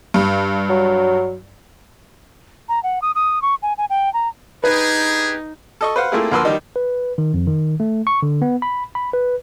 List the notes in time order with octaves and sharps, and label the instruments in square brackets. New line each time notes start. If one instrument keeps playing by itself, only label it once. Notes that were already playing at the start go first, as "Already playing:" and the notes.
[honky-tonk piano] G2
[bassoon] F#3
[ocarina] A#5
F#5
D#6
D#6
C#6
G#5
G#5
G5
A#5
[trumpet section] D4 G4 G#4 [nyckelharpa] D#4 [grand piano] B4
[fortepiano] A4 D#5 C#6
B4 C5 F5 F#5
A3 A#3 C4 E4 F4 G#4
D2 F3 A#3 B4 C6 E6
D#3 G3 D#4
[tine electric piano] B4
D#3
F2
D#3
A3
C#6
D3
B3
B5
B5
B4